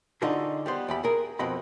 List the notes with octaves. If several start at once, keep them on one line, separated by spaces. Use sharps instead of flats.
D3 D#4 F4 F#4 G#4
G3 B3 C5
E2 G4 B5
G#4 A#4
F2 B2 C4 D#5 B5